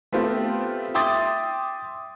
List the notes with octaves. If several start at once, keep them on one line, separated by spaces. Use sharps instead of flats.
A3 B3 C4 F4 G4 A4
E5 G5 C6 D6 D#6 A6